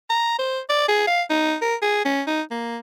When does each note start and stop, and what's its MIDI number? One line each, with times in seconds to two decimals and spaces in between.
0.10 0.39 82
0.39 0.60 72
0.69 0.84 74
0.88 1.04 68
1.07 1.22 77
1.30 1.56 63
1.62 1.75 70
1.82 2.03 68
2.05 2.22 61
2.27 2.42 63
2.51 2.78 58